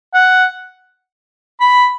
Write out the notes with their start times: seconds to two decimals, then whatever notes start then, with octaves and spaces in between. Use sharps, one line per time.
0.14 F#5
1.61 B5